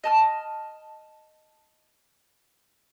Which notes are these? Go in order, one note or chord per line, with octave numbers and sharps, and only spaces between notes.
D#5 A5 F6